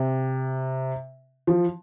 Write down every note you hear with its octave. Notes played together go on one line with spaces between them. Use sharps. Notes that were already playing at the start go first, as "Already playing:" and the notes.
Already playing: C3
F3